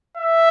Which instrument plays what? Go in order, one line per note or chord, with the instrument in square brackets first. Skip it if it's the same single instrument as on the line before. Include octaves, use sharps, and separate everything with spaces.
[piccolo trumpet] E5